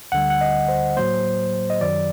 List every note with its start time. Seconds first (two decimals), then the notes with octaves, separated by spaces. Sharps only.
0.12 D2 D3 G3 F#5
0.30 F#5
0.41 D#5
0.68 C5
0.96 A2 F#3 A#3 C5
1.70 D#5
1.80 F#2 D#3 F#3 D5